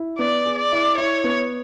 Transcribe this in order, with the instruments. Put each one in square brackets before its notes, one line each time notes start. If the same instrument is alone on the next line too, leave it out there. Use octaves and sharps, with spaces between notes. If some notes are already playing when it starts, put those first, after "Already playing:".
Already playing: [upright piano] E4
[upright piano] B3 [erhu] D5
[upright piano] G#4
[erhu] D5
[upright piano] E4
[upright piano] E4 [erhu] C#5
[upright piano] B3